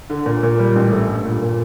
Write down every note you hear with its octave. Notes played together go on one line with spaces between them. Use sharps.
D3
A#2
A#2
G3
A1
A3
G2
A#2
A#2